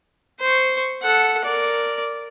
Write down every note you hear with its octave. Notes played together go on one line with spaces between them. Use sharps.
C5 C#6
A4 F#5
A#4 D5